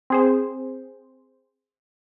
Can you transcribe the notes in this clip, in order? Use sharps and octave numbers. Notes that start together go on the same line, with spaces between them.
C4 G#4 C5